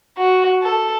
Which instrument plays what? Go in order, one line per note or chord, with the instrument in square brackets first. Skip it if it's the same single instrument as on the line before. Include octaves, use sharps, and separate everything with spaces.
[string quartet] F#4
A4